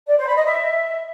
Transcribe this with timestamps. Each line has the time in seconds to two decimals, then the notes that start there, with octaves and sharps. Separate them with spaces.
0.07 D5
0.16 C5
0.26 B5
0.35 D#5
0.45 E5